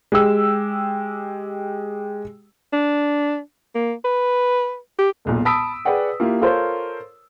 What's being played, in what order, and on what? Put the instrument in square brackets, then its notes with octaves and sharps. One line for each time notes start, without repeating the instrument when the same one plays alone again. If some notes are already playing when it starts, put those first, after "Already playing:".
[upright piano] G#3 G4 E6
[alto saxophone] D4
A#3
B4
G4
[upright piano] E1 B1 A#2
A5 B5 D#6 E6 B6 D7
G#4 B4 D5 F#5 G5
A#3 E4 F4 G4
F4 A4 A#4 C5 C#5